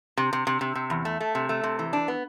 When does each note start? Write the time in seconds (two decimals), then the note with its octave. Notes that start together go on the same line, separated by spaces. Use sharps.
0.17 C3
0.33 C3
0.47 C3
0.61 C3
0.75 C3
0.90 E2
1.05 A3
1.20 A3
1.35 C3
1.49 A3
1.64 C3
1.79 E3
1.93 D4
2.08 B3